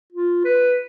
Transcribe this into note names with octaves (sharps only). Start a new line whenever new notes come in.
F4
B4